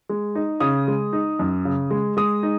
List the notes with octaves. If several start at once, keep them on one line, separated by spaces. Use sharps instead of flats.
G#3
D#4
C#3 D#6
G#3
D#4
F#2
C#3
G#3
G#3 D#6
D#4